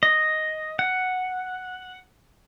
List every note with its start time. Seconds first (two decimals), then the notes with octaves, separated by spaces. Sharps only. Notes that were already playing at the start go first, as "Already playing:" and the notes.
0.03 D#5
0.79 F#5